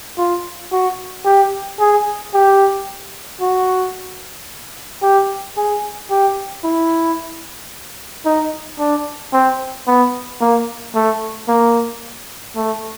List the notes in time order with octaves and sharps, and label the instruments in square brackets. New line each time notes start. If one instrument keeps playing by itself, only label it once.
[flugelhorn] F4
F#4
G4
G#4
G4
F#4
G4
G#4
G4
E4
D#4
D4
C4
B3
A#3
A3
A#3
A3